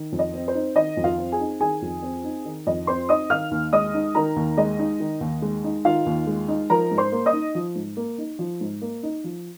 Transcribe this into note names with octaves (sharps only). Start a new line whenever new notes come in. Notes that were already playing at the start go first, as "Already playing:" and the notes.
Already playing: D#3
F2
D#5
C4
C5
D#4
D#3 D#5
F2
F4 F5
C4
G#4 G#5
D#4
D#3 G#4 G#5
F2
C4
D#4
D#3
F2 D#5
C4 C5 C6
D#4 D#5 D#6
D#3 F5 F6
D#2
G#3 D#5 D#6
D#4
D#3 A#4 A#5
D#2
G#3 D#5
D#4
D#3
D#2
G#3
D#4
D#3 F4 F5
D#2
G#3
D#4
F3 A#4 A#5
G#2
C5 C6
A#3
D#5 D#6
D#4
F3
G#2
A#3
D#4
F3
G#2
A#3
D#4
F3